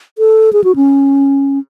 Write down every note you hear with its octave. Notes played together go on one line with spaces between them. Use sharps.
A4
G#4
F#4
C#4